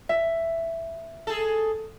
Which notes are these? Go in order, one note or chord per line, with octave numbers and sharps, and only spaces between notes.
E5
G#4 A4